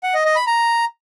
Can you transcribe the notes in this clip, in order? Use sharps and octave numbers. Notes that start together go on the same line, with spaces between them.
F#5
D#5
D#5
B5
A#5